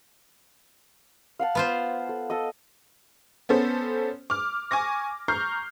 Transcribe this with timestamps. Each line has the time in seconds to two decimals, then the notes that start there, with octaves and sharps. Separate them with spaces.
1.39 F5 F#5 A5
1.55 B3 F4 C5
2.09 A4
2.30 A4 D#5
3.49 B3 C#4 A4 C5
4.30 D6 F6
4.71 G#5 C#6 D6 A#6
5.28 A#5 C#6 F6 G6 C7